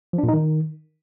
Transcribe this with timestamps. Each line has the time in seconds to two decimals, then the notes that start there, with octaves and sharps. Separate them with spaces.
0.13 F3
0.18 D4
0.23 A#2
0.28 D#4
0.34 D#3